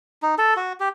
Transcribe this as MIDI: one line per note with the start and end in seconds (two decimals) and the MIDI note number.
0.22 0.35 63
0.38 0.54 69
0.56 0.73 66
0.80 0.89 67